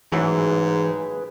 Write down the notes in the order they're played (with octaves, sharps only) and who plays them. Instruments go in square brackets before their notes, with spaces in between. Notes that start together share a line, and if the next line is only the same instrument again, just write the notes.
[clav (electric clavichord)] A1 F#3 E4 [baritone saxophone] G#2 [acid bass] E3 [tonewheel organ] G#4 B4